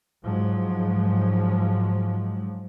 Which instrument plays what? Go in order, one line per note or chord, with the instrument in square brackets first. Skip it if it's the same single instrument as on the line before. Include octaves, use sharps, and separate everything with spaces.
[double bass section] G#2 F3 F#3 G#3